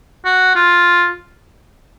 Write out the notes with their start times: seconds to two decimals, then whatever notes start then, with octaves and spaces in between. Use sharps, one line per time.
0.25 F#4
0.55 F4